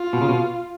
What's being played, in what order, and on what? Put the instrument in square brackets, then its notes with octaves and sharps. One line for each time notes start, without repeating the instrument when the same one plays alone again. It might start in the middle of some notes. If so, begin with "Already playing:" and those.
Already playing: [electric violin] F4
[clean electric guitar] B2
C#3
B2